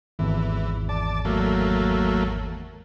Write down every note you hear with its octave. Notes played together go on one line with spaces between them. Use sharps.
G#1 E2 E3
D5 A5
F#3 A3 A#3